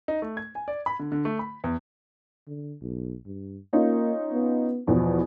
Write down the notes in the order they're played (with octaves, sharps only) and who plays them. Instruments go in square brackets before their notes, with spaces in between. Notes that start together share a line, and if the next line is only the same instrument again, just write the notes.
[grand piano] D#4
A3
G#6
G#5
D5
B5
D3
D3
A3
B5
E2
[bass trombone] D3
B1
G2
[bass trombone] A#3 [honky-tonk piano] C#4 D#4 F4
[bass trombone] B3
[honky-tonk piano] E2 B2 [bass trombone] F3